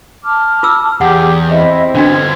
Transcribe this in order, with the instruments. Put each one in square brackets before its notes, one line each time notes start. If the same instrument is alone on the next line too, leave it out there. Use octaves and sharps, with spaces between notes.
[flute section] A5 D6 F6
[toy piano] F4 E6
[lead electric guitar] E2 [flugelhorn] G4 [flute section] G#4 [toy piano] F#5
[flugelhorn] C4 [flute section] E4 D#5 E5
[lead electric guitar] D3 B3 [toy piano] C#4 D4 F#4 [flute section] G#6